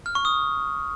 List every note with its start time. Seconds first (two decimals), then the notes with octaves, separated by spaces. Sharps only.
0.06 F6
0.15 C#6
0.25 D#6